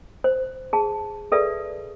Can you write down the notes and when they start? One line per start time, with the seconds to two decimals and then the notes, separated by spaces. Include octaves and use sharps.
0.24 C5
0.73 G#4 A5
1.32 G#4 A4 B4 D5 E5